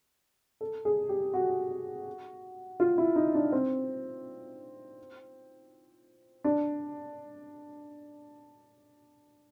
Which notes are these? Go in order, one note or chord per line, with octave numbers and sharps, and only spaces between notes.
A4
G#4
G4
F#4
F4
E4
D#4
D4
C4
D4